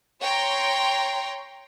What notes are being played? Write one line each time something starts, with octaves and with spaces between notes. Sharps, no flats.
C#5 G5 A#5 C6